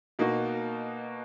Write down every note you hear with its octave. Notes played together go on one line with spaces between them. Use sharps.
B2 A#3 D#4 F#4